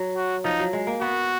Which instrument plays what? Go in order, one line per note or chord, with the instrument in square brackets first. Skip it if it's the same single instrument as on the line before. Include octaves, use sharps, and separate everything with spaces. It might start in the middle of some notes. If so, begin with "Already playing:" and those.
Already playing: [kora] F#3
[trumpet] F#4
[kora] F3 [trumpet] D#4
[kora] F#3
G#3
A#3
[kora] B3 [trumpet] F#4